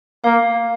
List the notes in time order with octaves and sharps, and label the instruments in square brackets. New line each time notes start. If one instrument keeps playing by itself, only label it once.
[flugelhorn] A#3 [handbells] F5